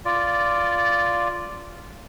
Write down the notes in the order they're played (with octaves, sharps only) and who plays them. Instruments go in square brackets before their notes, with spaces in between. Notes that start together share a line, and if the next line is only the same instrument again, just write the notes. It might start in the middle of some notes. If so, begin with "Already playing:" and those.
[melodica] F4 D5